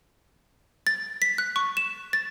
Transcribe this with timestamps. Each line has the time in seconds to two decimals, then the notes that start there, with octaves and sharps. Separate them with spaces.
0.87 A6
1.22 B6
1.38 F#6
1.56 C#6
1.77 E7
2.13 A6